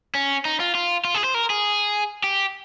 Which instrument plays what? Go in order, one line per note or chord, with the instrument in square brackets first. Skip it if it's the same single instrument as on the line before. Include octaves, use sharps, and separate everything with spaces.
[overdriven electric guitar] C#4
D#4
F4
F4
F4
G#4
C5
A#4
G#4
G4